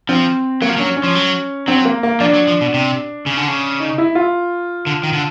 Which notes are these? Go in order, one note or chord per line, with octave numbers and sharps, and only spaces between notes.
F3 C4
F#3 A#3
F3
F#3 C#4
C#4
F3
F#3
F#3 C4
A#3
A#3
F3 D4
F#3
F3
B2
C3
C#3
D3
C#3
D#4
E4
F4
D3
D#3
D3